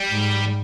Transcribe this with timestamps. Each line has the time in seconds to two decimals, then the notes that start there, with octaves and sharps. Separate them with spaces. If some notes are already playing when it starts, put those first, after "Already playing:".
Already playing: G3
0.10 G#2